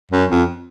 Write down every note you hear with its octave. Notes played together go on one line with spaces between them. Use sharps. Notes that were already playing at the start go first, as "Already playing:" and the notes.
F#2
F2